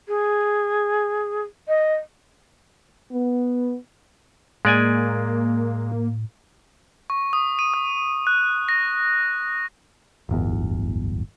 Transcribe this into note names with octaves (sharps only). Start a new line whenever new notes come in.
G#4
D#5
B3
A2 G#3 A#3 D5 G#5
C#6
D#6
D#7
D#6
F#6
A#6
D1 G1 E2